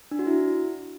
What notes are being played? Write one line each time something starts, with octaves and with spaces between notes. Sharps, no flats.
D4
F#4
E4